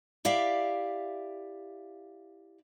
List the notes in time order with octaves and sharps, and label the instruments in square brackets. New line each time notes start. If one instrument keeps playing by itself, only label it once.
[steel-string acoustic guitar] E4 G4 D5 E5 F5